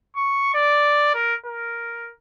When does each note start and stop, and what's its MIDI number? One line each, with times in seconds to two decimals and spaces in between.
0.16 0.49 85
0.54 1.12 74
1.14 1.34 70
1.46 2.12 70